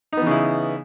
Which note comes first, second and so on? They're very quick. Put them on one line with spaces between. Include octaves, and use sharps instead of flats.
D#4 B3 E3 C#3 E4